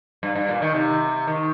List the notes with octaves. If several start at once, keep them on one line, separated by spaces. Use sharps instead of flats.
G2
G2
A#2
D#3
C3
D#3